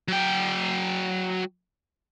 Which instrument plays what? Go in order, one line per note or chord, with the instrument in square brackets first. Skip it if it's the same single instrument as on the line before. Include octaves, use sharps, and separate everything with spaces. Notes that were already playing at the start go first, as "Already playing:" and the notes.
[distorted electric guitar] F#3 G5